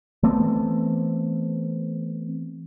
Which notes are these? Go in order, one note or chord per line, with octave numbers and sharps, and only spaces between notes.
E3 A3 B3 C4